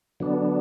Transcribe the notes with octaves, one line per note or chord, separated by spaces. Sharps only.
D3 F#3 B3 D4